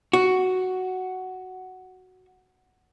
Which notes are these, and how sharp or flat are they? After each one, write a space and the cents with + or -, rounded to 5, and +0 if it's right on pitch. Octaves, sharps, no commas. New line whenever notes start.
F#4 +5